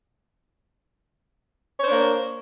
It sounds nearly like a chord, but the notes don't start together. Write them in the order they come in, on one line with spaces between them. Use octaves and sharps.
C#5 C5 D4 A#3